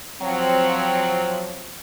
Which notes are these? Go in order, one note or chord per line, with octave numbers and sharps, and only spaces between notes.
F3 F#3 C4